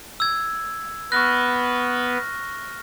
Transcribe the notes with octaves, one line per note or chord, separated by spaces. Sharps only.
E6 G#6
B3 B4 C#6 F6 F#6 A#6